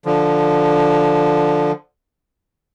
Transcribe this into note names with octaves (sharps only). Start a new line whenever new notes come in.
D3 F3